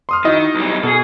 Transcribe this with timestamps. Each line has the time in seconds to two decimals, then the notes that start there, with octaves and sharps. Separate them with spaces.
0.09 C6 D#6 F6
0.24 D#3 E4 F#4 D#5
0.54 B1 G3
0.83 B2 G#4 A4